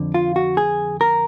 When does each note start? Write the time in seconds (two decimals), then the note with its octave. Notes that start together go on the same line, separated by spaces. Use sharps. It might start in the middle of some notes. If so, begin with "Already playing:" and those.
Already playing: F2 D3
0.14 F4
0.36 F#4
0.57 G#4
1.01 A#4